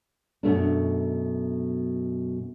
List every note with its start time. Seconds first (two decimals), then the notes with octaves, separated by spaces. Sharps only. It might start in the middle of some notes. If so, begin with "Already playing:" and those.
0.43 F#2 B2 A3 D4